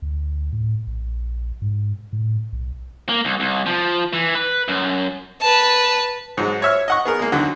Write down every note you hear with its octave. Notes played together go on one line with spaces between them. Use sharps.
D2
A2
A#1
G#2
A2
B1
A#3
C2
C2
F3
E3
B4
F#2
B4 A5
G#2 F#3 G#3
C#5 E5 F6
D#5 F#5 C#6
B3 G#4 A#4
G#3 A#3
D2 D3 D#3 F#3